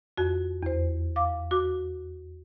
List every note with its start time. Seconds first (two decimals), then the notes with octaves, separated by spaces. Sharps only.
0.18 F2 F#4
0.63 E2 C5
1.16 F5 D6
1.51 F#4 D6